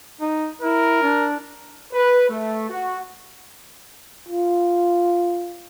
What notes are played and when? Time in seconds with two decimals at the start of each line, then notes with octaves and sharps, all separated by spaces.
0.21 D#4
0.62 E4 A#4
1.03 D4
1.92 B4
2.29 A3
2.69 F#4
4.29 F4